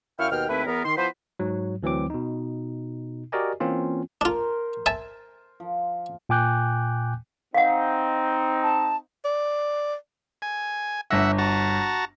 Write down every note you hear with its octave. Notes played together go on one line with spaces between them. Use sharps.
F#2 E4 F5 G5 C#6 F6
D#2 B2 G5 F6
D#2 A3 C4 E4 B4
E2 B3 A#4
D#3 C6
F3 B3 E4 B4 C5
G#2 F#3
D2 E3 F#3 C4 D6
B2 D#4
F#4 G4 A#4 D5 D#5 G#5
E3 A#3 C4 C#4 F4
D4 F4 A#4 C5
E5 G#5 A5
F3
A#2 G5 G#5 D6 F#6 G6
C4 D#4 F5 F#5
A5
D5
G#5
G1 E5 F#5 A#6
F#4 A5 A#5